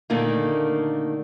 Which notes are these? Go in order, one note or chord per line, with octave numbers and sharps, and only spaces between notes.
A#2 D3 D#3 A3 A#3